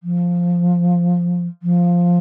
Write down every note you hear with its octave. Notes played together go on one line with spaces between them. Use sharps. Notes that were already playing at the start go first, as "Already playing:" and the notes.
F3
F3